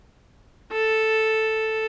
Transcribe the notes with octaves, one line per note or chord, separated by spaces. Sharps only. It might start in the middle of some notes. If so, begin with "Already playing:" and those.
A4